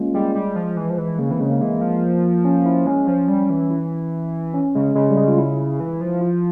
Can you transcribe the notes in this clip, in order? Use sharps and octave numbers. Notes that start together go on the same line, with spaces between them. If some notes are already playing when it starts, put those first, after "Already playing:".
Already playing: G#3 A#3 C#4 F4
G3 G#3
G3
F3
E3
F3
E3
C#3 A#3
E3 C4
C#3 G#3
A#3
E3 G#3
F3 A#3
C#4
E4
G#3 C#4
F3
G3
E3
E4
C#4
C#3 G#3
C#3 G#3
G3
G#3
F4
E4
E3
F3
F4